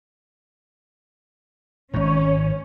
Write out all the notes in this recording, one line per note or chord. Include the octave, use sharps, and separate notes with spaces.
G#1 G#2 C#4 C#5